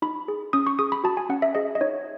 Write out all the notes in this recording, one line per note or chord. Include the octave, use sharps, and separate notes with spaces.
D#4 B5
G#4
C#4 D#6
C#6
G#4 D#6
B5
F#4 A5
G#5
C#4 F#5
E5
G#4 D#5
D#5
D#4 C#5